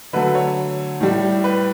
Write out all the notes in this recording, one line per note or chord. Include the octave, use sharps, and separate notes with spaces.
D3 F#3 A3 B4
C#5
A2 G3
B4